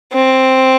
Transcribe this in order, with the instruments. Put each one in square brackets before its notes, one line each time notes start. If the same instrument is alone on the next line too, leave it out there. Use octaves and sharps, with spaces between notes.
[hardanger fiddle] C4